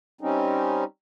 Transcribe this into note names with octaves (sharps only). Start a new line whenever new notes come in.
G3 C4 C#4 D#4